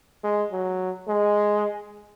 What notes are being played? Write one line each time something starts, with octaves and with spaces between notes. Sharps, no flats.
G#3
F#3
G#3